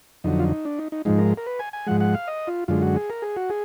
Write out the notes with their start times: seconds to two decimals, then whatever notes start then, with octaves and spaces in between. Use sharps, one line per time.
0.24 F2 D3 F#3 D#4
0.39 F4
0.44 D#4
0.65 D4
0.79 D#4
0.92 D#4
1.05 G#2 F3 G#3 D#4
1.18 A#4
1.38 A#4
1.46 B4
1.59 G#5
1.73 G#5
1.87 G#2 F3 G#3 F#5
2.01 F#5
2.14 F5
2.28 D#5
2.47 F4
2.68 F#2 D3 G#3 F4
2.82 F#4
2.96 G#4
3.10 A#4
3.22 G#4
3.36 F#4
3.50 G#4